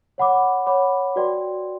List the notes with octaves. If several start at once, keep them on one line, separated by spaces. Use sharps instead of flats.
C#5 F#5 B5 D6
C#5 F#5 B5 D6
F#4 B4 D5 G5 C6